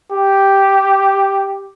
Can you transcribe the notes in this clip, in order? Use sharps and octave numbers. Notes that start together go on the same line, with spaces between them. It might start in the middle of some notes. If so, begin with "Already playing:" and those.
G4